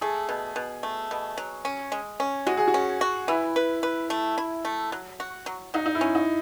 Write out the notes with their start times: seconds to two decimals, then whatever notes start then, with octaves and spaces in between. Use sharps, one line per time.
0.01 A3 G#4
0.29 B2
0.56 B2
0.83 A3
1.11 B2
1.38 F#3
1.65 C#4
1.92 G#3
2.20 C#4
2.47 G#3 F#4
2.57 G#4
2.67 F#4
2.74 C#4
3.01 F#4
3.28 E3 E4
3.56 B4
3.83 B4
4.10 A3
4.38 E4
4.65 A3
4.92 F#3
5.20 F#4
5.46 F#3
5.74 F#3 D#4
5.86 D#4
5.95 E4
6.01 C#4
6.15 D#4